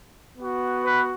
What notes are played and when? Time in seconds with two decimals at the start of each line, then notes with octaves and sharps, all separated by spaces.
0.35 B3 F#4
0.85 B4